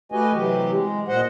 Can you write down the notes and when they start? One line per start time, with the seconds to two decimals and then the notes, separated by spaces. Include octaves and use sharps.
0.12 A3 F#4 G4 B4 D#5 G#5
0.33 C3 E3 F#3 G4
0.72 G#3
1.08 A#2 C5 D#5 F#5